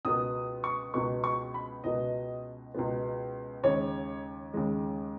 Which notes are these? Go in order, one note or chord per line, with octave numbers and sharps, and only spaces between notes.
C#2 B2 B3 D#6
C#6
C#2 B2 B3 C#6
C#6
B5
C#2 B2 B3 D#5
C#2 B2 B3
D#2 C#3 G#3 C#5
D#2 C#3 G#3